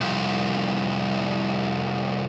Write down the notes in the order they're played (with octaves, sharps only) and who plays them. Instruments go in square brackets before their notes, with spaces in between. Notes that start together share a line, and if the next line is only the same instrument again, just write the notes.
[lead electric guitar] C2 F2